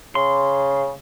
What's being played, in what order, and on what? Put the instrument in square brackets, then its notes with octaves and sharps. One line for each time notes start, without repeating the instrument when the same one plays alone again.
[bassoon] C#3 [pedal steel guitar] C6